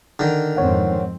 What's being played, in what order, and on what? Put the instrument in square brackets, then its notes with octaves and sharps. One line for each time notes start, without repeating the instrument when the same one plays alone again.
[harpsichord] D3 D#3
[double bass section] F2 G#2 C4 [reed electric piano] C#5 F#5